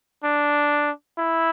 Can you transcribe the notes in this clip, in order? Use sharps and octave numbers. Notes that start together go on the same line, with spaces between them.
D4
E4